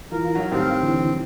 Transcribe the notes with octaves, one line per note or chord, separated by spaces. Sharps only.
E3 F4 A#4
F#3 D#4
A2 D#3 G3 C4 F5
D3 E3